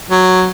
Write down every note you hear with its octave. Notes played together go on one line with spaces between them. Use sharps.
F#3